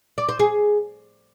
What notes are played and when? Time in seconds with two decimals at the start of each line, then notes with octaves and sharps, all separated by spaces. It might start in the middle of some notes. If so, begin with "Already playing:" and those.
0.18 D5
0.29 C5
0.39 G#4